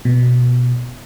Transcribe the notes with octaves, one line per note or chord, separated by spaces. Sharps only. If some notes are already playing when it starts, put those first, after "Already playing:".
B2